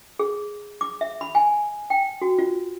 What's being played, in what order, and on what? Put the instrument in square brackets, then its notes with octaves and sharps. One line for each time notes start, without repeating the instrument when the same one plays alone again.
[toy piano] G#4
D6
E5
B5
G#5
G5
F#4
F4